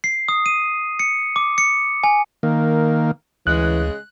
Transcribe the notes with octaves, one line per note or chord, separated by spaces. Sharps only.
C7
D#6
D#7
C#7
D6
C#7
G#5
D#3 A#3
D2 C#3 E3 G#3 F#6